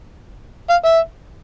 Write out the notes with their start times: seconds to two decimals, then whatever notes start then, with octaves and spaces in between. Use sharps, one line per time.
0.70 F5
0.85 E5